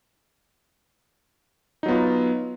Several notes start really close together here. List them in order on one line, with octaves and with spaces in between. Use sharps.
D#4 F#3 B3 F4